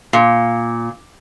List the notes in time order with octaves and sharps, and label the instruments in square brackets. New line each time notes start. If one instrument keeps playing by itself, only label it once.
[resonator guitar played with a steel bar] A#2